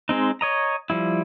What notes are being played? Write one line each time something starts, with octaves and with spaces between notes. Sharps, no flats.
G#3 C4 D#4
C#5 D#5 A#5
F3 G3 E4